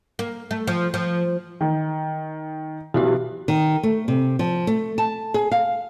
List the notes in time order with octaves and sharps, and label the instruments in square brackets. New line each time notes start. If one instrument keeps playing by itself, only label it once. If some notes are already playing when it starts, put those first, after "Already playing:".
[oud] A#3
A3
F3
F3
[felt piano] D#3
[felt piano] B1 E3 [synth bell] E4 F#4 G4
[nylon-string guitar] D#3
A3
C3
F3
A3
A5
G#4
F5